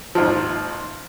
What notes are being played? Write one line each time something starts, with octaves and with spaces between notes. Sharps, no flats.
A1 D#2 G#2 F3